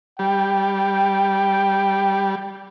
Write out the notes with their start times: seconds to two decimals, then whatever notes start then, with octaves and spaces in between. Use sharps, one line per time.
0.19 G3 G5